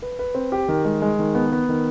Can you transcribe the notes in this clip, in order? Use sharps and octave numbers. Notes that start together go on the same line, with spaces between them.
B4
B4
C4
G4
D#3
G#3
G#3
D#3
B3
B3
D#3